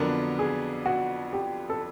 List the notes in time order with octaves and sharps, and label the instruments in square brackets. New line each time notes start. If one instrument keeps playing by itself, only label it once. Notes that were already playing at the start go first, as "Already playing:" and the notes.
Already playing: [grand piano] F2 D3 F#3 B3 D4 [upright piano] A#4
[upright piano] G#4
F#4
G4
A4